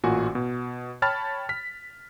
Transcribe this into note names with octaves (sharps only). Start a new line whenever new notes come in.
A1 A#2 F4 F#4 G#5
B2
C#5 G5 A5 B5 F6 A6
F6 B6